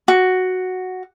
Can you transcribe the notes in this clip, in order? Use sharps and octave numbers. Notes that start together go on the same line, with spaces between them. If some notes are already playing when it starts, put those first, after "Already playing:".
F#4